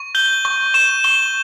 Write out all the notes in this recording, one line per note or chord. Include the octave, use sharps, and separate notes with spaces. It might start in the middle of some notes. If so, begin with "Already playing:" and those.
Already playing: C#6
G6 G7
C#6
C#6 E7
C#6 G7